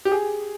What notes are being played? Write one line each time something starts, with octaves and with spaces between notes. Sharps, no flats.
G4
G#4